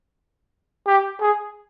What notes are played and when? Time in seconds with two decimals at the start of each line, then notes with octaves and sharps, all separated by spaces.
0.87 G4
1.21 G#4